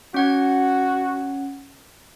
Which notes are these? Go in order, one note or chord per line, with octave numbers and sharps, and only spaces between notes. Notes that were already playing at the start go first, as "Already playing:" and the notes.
C#4 F#4 F#5 G#6